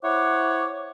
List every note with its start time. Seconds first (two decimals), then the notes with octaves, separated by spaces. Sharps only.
0.02 E4 C5 C#5 F#5 D6